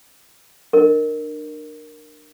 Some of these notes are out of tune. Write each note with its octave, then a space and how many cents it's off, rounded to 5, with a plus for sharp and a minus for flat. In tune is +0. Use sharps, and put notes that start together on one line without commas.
D4 +30 A#4 +0 D#5 +0